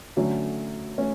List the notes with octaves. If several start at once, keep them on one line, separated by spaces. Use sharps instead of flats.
D3 F#3 A3 C#4
A3 C#4